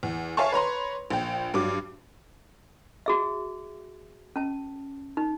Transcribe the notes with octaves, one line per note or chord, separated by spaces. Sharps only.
E2
C#5 E5 F5 G#5 A5 C#6
B4 C#5 A#5 C6
A#1 G5
G2 F#3 D6
F#4 G#4 E5
C#4 A5
D#4